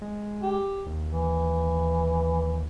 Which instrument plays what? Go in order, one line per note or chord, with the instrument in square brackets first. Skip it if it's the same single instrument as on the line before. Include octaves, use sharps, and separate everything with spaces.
[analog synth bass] G#3
[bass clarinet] G4
[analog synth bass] D#2
[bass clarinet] E3